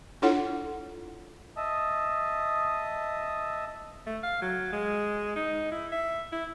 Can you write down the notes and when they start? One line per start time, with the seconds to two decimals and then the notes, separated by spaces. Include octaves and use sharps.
0.22 D4 E4 F4 A4 C#5 F#5
1.57 D#5 E5 A5 D#6
4.07 A3
4.23 F5
4.42 F#3
4.72 G#3
5.36 D#4
5.72 E4
5.92 E5
6.32 E4